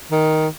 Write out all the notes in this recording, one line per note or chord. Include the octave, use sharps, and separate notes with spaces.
D#3